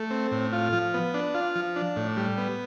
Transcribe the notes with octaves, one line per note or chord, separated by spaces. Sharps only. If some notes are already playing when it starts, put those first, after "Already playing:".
Already playing: A3
C4
A2
F4
F3
B3
D4
F4
F3
D4
A2
G3
B3